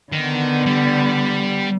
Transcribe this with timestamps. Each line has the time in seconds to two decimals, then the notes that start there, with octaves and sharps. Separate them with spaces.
0.12 D3 D#3 B3
0.66 G3